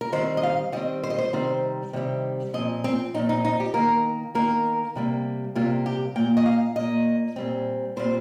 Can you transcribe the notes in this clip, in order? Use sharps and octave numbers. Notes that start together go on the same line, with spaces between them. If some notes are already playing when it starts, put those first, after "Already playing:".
A#4
D#3 G3 C4 C5
D#5
F5
D#3 G3 C4 D#5
C5
D#5
C5
C3 D#3 G3 C4 C5
C3 D#3 G3 C4
A#2 F3 C4 D#5
C4
A#2 F3 C4 D#4
D#4
D#4
G4
D#3 A#3 A#4
D#3 A#3 A#4
C3 G3 A#3
C3 G3 A#3 F4
G4
A#2 A#3 G5
D#5
F5
A#2 A#3 D#5
A#2 G3 C4
A#2 G3 C4 C5